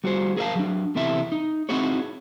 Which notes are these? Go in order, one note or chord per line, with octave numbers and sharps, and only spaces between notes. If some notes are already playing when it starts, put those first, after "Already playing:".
G3 F#4 G#4 C5
G#4 A#4 C#5 E5 F5 A5
F#3 D4
E2 C3 E4 A4 E5
D#4
C4 D#4 E4 F#4 G#4 C#5